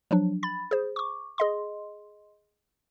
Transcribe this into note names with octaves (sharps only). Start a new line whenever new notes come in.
F3 F#3 D4
B5 A6
G#4 C5
C#6 D6
G#4 D#5 C6